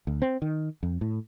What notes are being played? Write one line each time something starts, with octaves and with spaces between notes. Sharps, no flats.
D2
C4
D#3
F2
A2